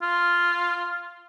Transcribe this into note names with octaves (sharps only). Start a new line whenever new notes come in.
F4